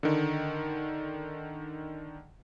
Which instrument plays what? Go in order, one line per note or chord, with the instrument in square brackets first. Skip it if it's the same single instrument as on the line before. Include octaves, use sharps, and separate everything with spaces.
[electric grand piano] D3 D#3